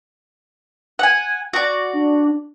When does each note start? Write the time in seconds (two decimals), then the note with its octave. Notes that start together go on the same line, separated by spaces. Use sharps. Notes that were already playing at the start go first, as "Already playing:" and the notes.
0.99 F#5 G#5
1.53 F#4 D5
1.93 D4